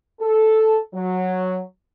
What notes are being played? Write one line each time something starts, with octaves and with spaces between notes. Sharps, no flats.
A4
F#3